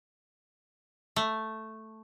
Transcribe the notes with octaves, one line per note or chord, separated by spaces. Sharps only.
A3